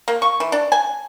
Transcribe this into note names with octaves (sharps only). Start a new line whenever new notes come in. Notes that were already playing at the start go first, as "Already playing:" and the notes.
A#3
C#6
E3
D4
G#5